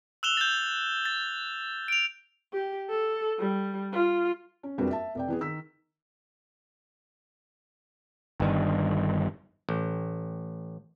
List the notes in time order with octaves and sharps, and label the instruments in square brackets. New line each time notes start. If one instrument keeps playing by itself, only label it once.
[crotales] E6 F#6 E7 F7 G7
G6 A6
A6
D7 F7
[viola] G4
A4
G3
F4
[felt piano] C#4
F#1 F2 G3 D4 F#4 B4
E5 A5
F1 D5 G5
E3 B3 G#4
D#3 E6 B6
[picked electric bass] G1 G2 D#3
[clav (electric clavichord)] A1